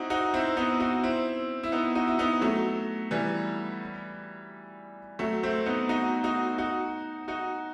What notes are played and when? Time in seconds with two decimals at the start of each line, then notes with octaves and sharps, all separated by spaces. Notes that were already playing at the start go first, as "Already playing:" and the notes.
Already playing: C4 D#4 E4 F#4
0.10 D#4 F#4
0.34 C4 E4
0.57 B3 D#4
0.80 D#4 F#4
1.03 C4 E4
1.63 E4
1.72 B3 D#4
1.95 D#4 F#4
2.07 E4
2.19 B3 D#4
2.42 F#3 A3
3.11 E3 G3
5.19 F#3 A3
5.43 A3 C4
5.66 B3 D#4
5.89 D#4 F#4
6.24 D#4 F#4
6.58 D#4 F#4
7.28 D#4 F#4